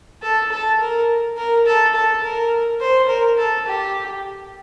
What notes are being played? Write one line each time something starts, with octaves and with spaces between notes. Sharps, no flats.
A4
A4
A#4
A#4
A4
A4
A#4
C5
A#4
A4
G4